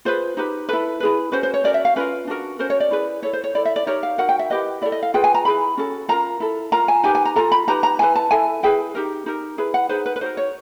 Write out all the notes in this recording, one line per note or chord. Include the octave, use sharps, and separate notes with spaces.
F4 G#4 B4 C5
D#4 G4 B4
E4 A4 B4
E4 G#4 B4
C#4 F#4 B4 C5
C5
C#5
C#4 F#4 A#4 D5
E5
F5
C#4 F4 A#4 B4
D4 F#4 A#4
C#4 F#4 A#4 C5
C#5
D5
E4 G#4 B4
E4 A4 C#5
C5
C#5
E4 A4 D5
E5
D5
D#4 G4 A#4 C#5
F5
D#4 F#4 A#4 F#5
G5
E5
E4 G4 B4 D#5
E4 A4 D5
D#5
F5
F4 G#4 B4 G5
G#5
A#5
E4 G#4 B4 B5
C#4 F#4 A4
F4 A#4 A#5
E4 A4
F4 A#4 A#5
G#5
D#4 G4 B4 G#5
G#5
A#5
F4 A4 A#5
B5
D#4 G4 B4 A#5
A#5
E4 G#4 B4 G#5
A5
E4 A4 G#5
E4 G#4 B4 G5
D#4 G4 A#4
D#4 G4 A#4
E4 G#4 B4
F#5
D#4 G#4 B4 C5
B4
B4
D#4 F#4 A#4 C5
C#5